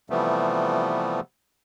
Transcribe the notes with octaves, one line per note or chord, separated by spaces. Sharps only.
C3 E3 F3 G3 A3 B3